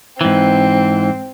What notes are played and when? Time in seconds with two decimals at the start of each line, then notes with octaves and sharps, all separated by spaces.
0.21 G#2 E3 C4